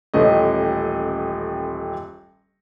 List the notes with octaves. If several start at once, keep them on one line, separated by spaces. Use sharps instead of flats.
D#1 A1 A3 D#5